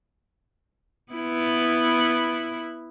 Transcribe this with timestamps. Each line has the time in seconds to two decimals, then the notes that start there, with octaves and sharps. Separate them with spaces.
1.13 B3 E4